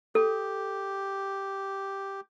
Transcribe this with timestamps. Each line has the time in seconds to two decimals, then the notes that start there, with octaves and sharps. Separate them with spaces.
0.15 G4 A4